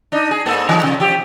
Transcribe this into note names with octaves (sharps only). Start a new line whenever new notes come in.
D4 D#4
G#4
G#2 A#3 A4
E3 D#4
C3 F3
F3 G4